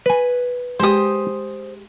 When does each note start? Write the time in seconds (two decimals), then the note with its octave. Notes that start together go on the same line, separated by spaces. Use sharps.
0.06 B4 G#5
0.79 G#3 G4 C5 D#6